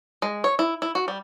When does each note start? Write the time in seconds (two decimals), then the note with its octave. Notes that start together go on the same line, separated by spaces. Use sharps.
0.22 G#3
0.44 C#5
0.59 E4
0.82 E4
0.95 F#4
1.08 G3